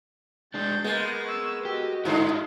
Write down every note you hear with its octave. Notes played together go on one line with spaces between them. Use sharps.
G#3 D4 G6 A6
G#3 A#3 B3
C#6 E6
F#4 G4 D#5
G2 D3 E4 F4 C5